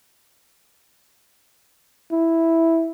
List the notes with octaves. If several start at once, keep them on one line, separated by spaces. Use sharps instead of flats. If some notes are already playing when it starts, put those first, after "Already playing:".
E4